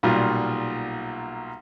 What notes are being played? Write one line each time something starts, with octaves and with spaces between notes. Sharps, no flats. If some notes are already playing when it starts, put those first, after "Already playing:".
B1 A#2 G3 F4 F#4